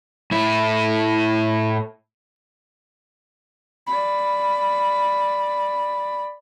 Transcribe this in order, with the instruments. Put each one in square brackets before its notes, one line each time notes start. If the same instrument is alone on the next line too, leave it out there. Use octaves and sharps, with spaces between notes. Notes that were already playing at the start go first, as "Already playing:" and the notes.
[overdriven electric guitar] A2 E4
[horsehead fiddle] D5 B5